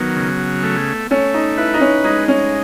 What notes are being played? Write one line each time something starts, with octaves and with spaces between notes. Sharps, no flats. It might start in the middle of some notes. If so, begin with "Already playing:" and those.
Already playing: D#3 F#3 B3
C#3
A3
A3 C#4
D#4
E4 B4
D#4
C#4
G#3 D#4
C#4